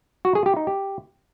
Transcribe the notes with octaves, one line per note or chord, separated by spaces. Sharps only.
F#4
G#4
G4
D#4
G4